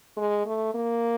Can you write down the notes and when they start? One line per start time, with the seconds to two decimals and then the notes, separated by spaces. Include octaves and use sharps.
0.17 G#3
0.46 A3
0.74 A#3